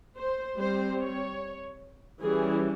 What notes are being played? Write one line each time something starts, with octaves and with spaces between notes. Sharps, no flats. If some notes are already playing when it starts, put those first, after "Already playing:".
C5
G3 C4 C5
C#5
E3 G3 C#4 G#4